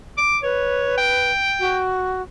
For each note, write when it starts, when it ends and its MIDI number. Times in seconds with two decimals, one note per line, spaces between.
0.18 0.37 86
0.43 1.31 71
0.43 0.94 73
0.98 1.79 79
1.60 2.22 66